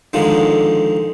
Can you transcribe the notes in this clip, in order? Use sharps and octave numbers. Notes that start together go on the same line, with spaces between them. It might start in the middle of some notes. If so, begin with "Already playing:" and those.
D3 D#3 F3 G#3